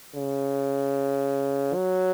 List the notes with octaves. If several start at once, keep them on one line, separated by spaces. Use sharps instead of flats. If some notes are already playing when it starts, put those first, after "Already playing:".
C#3
F#3